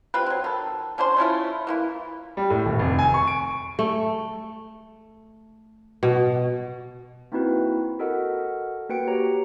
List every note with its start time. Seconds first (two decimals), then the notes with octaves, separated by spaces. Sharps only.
0.14 G3 C4 F4 B4
0.26 F#3 C4
0.44 D#3 A4
0.98 C#4 D4 C5 C6
1.17 A3 C#4 E4 F4
1.67 E3 A#3 E4
2.37 G3
2.50 A2
2.66 D#1
2.79 F1
2.99 G#5
3.14 C#6
3.28 D7
3.79 A3
6.03 B2
7.32 A#3 C4 D#4 E4 F#4 B4
7.99 F#4 A4 A#4 D#5 F#5
8.89 A#3 F#4 B4 G5 C#7 D7
9.07 F#4 G4 C#5 A#5